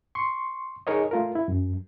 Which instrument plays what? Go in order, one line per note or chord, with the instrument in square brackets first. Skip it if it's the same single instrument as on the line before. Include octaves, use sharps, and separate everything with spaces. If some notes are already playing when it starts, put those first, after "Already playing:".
[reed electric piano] C6 C#6
D#4 G#4 A#4 C#5 D#5
A3 F4 A#4
E4
F#2